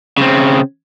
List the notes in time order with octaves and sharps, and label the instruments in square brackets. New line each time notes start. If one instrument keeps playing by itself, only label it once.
[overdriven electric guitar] C#3 C4